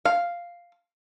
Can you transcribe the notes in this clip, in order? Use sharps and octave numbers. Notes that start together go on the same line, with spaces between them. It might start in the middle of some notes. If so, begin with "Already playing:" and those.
F5